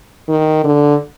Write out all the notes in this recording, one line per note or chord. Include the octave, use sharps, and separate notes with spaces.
D#3
D3